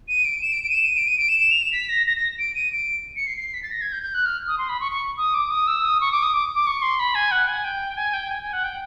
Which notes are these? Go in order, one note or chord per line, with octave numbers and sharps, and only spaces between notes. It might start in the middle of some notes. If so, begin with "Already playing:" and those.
D#7
D7
E7
D7
D7
D#7
E7
D#7
D7
D#7
D7
E7
E7
F7
E7
B6
A#6
A#6
A#6
D7
D#7
D7
C#7
C7
C7
B6
A6
A#6
G#6
G6
G6
F#6
F6
D#6
C6
B5
C#6
C#6
D#6
D6
D#6
E6
D#6
C#6
D6
D#6
D6
D6
C#6
C6
B5
G#5
F#5
G#5
G5
G#5
G5
G#5
G#5
F#5
G5